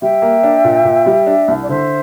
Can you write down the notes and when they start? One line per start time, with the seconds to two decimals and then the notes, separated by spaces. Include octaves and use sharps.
0.01 G3 E5 G5
0.22 A#3
0.43 D4
0.64 A#2
0.85 A#2
1.06 G3
1.26 D4
1.48 C2
1.61 D5
1.69 D3 C5 E5